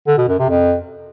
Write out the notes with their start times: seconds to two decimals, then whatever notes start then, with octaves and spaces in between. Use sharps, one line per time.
0.07 D3
0.18 B2
0.28 F#2
0.39 C3
0.49 F2